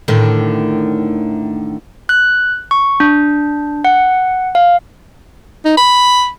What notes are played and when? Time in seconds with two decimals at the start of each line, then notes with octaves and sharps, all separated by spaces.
0.08 A2 D3 D#3
2.09 F#6
2.71 C#6
3.00 D4
3.85 F#5
4.55 F5
5.65 D#4
5.77 B5